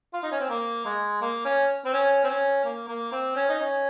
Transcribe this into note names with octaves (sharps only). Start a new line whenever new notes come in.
F4
D#4
C#4
C4
A#3
G#3
A#3
C#4
C4
C#4
C4
C#4
A#3
A#3
C4
C#4
D#4
C#4